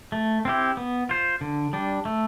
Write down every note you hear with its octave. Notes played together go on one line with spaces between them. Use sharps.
A3
C4 E4 G4
B3
F4 C5
D3
G3 D4
A3